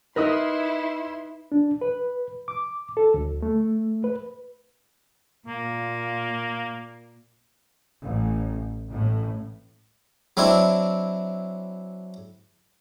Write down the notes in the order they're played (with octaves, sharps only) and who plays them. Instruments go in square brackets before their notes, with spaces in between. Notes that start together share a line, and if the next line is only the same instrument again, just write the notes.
[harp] D#4 B4 [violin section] E4 C6 [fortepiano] A#4 D#5 D#6
[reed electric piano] D4
B4
D6
A4
D2
A3
B4
[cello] A#2 [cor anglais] A#3
[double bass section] A1
A1 A2
[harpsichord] F#3 C4 D4 E4